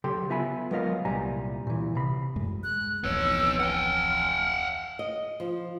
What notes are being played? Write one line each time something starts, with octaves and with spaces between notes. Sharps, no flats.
C#3 F#3 G4 A4 G5 C6
B3 F4 E5 G#5 B5
F#3 G#3 B3 A#4 D#5 F5
C2 A#2 G3 G#5 A#5
A#2 E3
C3 B5
F#2 A2 G#3
G#3 F#6
D1 A1 F2 B3 C#5 E6
F#5 G5 F6
D#5
F3